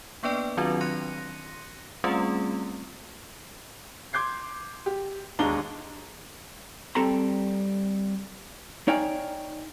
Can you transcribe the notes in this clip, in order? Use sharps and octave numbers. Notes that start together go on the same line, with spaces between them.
A#3 B3 D4 B4 D5 G5
D#3 F#3 C4 D4 F4 F#4
C6 F#6 A#6 C#7 D#7
G3 A3 C4 C#4 F4 G#4
C6 D6 G6 G#6 C7
G4
E1 D#2 G#3 D4 A#5 G7
G3 C4 A4 A5 A#5 C6
D#4 C#5 D5 F5 G5 G#5